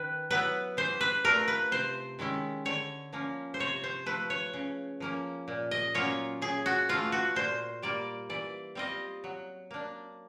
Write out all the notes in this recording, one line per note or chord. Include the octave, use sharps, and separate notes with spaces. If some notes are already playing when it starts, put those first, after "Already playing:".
Already playing: D#3 B4
F#3 B3 E4 B4
E3 C5
B4
A3 D4 F4 A#4
B4
C3 C5
D#3 G#3 C#4 E4
D3 C#5
F3 A#3 C#4
C5
C3 C#5
C5
F3 A3 B4
C#5
C#3
F3 A#3 C#4
A#2
D#5
F#3 A#3 C#4 F4 C#5
C#3 G#4
F#4
E3 A3 F4
F#4
A#2 C5
G3 A#3 D5
E3 D5
G3 C4 F4 D#5
F#3
A#3 D4